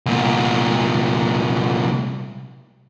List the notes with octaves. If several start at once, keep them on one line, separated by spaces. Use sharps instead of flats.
C2 A#2